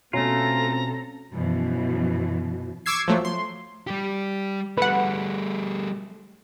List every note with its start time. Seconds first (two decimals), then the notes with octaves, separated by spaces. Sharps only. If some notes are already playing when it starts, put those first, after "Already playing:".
0.13 B2 A3 C4 C#4 F4 A4 A#5
1.34 F#2 B2 E3 F3
2.86 C#6 D6 E6 G#6 C7
3.08 F3 F#3 A3
3.25 C6
3.87 G3 G4
4.78 G3 A3 B4 F#5